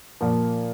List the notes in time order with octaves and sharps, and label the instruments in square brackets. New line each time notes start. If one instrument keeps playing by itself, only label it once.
[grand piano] A#2 F3 A#3